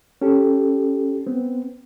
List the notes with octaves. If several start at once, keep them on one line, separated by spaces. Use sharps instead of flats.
C#4 G4 A4
B3 C4